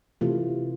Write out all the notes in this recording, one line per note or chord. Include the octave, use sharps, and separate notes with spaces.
C3 E3 A3 F4